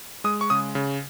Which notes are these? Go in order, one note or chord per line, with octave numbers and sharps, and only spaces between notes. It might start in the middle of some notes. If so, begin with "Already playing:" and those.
G#3 D#6
C#6
C#3 D#6
C#3